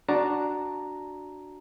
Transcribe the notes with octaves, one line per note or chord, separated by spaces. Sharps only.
D4 F#4 A5 A#5